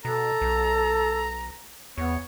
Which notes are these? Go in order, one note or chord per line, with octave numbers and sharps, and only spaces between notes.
B2 A4 A#5
B1
E2 B3 C#5